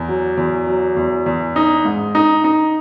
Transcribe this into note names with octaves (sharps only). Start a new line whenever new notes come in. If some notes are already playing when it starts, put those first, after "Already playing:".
Already playing: E2
F#3
E2
F#3
E2
E2
D#4
G#2
D#4
D#4